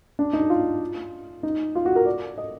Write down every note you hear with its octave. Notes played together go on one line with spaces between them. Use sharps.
D4
D#4
F4
D#4
F4
F#4
A#4
D5
D#5